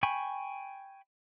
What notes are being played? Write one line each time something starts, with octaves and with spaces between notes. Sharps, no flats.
G5 G#5 B5 C#6